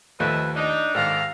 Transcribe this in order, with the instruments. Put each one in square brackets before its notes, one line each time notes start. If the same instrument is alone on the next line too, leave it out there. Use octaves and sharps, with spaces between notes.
[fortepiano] D#2 F3 A3 [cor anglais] B4 [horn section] D#5 E5 A5
[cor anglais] D4 [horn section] D#4
[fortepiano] G#2 D#3 [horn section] G4 A4 A#5 [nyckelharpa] F5